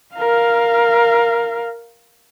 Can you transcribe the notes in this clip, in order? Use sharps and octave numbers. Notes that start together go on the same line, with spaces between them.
A#4 F5